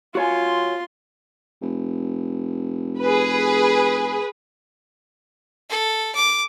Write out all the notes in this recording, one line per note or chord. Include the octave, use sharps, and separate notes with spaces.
F4 F#4 C#5 G#5 C6
F1
G#4 B4
A4
D6